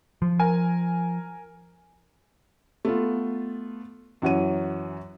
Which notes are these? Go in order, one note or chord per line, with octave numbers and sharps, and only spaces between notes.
F3
A#4 G#5
A3 B3 F4
F#2 E3 F#4 C#5 D#7